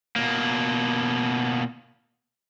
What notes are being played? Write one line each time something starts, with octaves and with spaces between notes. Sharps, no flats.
B2 A#3